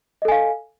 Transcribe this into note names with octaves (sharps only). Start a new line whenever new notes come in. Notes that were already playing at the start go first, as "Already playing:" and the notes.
A4 D#5 F5 G#5